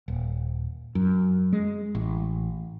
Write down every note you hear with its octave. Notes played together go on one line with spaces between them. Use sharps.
D#1
F#2
G#3
A1